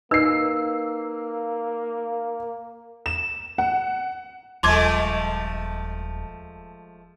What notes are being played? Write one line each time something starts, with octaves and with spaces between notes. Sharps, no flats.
A#3 D#4 B4 D#5 E6 C7
E7
F#5
D#1 F3 G#3 A3 C6 D6 G#6